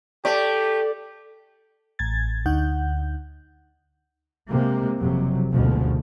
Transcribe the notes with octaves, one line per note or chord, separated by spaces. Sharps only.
A3 G4 D5
A1 G#6 A6
D2 D#4 F#5 G6
C3 G#3 A#3
F#1 F2 C3 F#3
F#1 D2 B2 F3 G#3